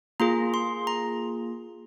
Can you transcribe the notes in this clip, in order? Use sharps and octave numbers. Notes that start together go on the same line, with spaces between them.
A#3 F4 G#4 A#5
C6
A#5